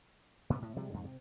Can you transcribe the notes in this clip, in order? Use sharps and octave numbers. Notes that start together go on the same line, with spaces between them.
G#2 C3 G#3 B3
A2
C3 F3 G3 G#3
F2 G#2 C#3
C3